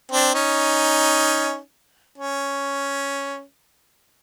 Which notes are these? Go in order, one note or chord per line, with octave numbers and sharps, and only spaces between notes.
C4 D4
C#4 D#4
C#4